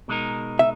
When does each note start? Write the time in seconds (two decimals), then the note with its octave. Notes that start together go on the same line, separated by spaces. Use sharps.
0.08 B2 G#3 D#4 A#4
0.59 E5